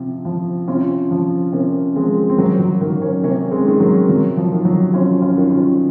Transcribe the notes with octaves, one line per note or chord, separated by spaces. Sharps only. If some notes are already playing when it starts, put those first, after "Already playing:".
Already playing: C3 F3
F3
C3 C#4 F4
F3
C3 A#3 C#4
F3 G#3 C4
C4
C3 F#3 A#3
F#3 A#3
D#3 F#3 A#3
A#3 C#4
C3 A#3 C#4
G#3 C4
D#3
F#3 A#3
C3 F#3
F3
D#3
F#3
C3 C#4 F4
C#4 F4
D#3
C#4 F4